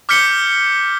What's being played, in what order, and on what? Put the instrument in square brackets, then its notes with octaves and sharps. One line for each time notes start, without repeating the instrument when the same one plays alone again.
[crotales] D6 F6 G6 B6 C#7 G7